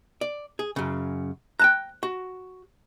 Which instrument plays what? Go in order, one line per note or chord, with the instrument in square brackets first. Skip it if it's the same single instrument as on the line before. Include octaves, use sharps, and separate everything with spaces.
[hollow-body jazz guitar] D5
G#4
F#2 C#3
[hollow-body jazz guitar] G5 A5 A#5 [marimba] F#6
[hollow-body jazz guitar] F#4